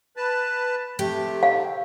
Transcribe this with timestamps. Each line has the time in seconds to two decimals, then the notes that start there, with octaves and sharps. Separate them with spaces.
0.17 B4 A5
0.99 C3 A3 G4
1.43 F5